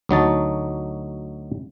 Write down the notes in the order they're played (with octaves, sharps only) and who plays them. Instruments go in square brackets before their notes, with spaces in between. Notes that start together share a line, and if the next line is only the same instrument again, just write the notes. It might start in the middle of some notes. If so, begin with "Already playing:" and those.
[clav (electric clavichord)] D2 F#3 D#4 A5